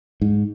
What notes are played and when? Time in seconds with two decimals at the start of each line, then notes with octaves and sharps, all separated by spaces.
0.22 G#2